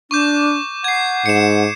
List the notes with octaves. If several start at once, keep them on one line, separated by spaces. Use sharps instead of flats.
D4 C#6 D6 G6
F#5 G#6 C7
G#2 C#7 E7